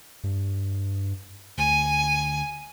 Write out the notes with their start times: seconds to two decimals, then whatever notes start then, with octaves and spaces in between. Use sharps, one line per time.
0.24 G2
1.58 D2 G#5